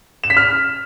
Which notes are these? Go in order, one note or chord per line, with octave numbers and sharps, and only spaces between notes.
E7
B6
F6